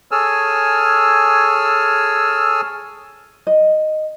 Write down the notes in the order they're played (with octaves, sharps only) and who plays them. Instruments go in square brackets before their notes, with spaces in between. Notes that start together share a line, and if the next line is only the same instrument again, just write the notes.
[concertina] G#4 A4 C#5 G#5 E6 F6
[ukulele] D#5